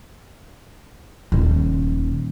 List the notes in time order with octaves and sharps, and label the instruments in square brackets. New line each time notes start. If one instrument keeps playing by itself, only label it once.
[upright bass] D#1 D#3